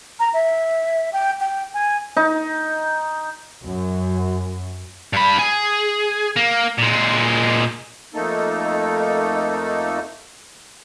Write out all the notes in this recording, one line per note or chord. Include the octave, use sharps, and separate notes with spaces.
A#5
E5
G5
G5
G#5
D#4
F#2
G2 B5
G#4
A#3
A#2 G#3
F2 A3 A#3 D#4 A4